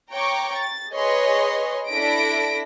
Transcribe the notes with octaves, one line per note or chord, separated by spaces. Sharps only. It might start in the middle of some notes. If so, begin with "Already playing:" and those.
C#5 G5 A#5 C#6 D6
A6
G#4 B4 C#5 D#5 C6
D4 E4 A4 A#6 B6 D7